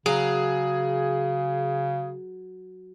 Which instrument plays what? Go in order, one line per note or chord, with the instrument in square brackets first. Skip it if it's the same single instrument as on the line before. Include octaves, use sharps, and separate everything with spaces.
[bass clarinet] C#3 [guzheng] F#3 [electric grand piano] G#4